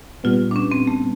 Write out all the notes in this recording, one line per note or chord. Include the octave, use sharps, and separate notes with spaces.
A#2 G3 B3 F4
D4
C#4
C4
A3